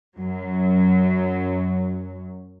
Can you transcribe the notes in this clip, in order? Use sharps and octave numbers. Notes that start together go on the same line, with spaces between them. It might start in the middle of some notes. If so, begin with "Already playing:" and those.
F#2 F#3